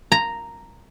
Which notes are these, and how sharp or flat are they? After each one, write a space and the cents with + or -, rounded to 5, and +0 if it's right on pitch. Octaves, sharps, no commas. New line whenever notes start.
A#5 -5